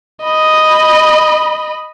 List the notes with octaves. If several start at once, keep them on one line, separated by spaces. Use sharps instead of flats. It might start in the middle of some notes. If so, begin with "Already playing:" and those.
D#5 B5